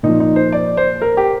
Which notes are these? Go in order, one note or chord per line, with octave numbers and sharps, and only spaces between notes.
A#2 F3 D#4
D#4
C5
D5
C5
A#4
G4